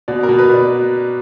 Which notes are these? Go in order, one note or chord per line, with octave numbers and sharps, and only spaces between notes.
B2 D5
A#4
B2
B4
B2 D5